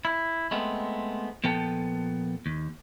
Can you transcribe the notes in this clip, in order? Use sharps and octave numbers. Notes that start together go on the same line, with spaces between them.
E4
G#3 A3 B3 C4
A#2 F3 B3 A4 G5 A5
D#2